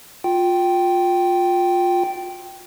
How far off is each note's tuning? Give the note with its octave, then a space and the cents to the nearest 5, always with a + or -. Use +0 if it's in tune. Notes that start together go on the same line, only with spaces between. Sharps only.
F4 +20 G5 -10